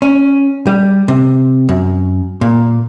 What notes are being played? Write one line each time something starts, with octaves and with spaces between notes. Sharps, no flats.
C#4
G3
C3
F#2
A#2